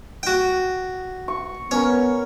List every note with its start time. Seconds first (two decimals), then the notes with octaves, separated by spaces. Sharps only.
0.23 F#4 G5
1.28 C#6
1.71 B3 C#4 A#4 C#5